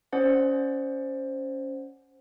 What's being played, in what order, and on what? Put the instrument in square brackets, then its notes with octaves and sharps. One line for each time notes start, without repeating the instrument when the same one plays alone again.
[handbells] C#4 C5 D5 F#5